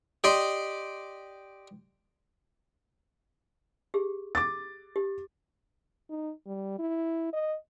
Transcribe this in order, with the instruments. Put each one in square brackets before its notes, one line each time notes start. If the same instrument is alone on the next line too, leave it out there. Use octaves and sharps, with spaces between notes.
[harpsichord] G4 D5 D#5 C6
[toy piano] G4 G#4
[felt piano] D6 A6
[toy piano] G4
[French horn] D#4
G3
E4
D#5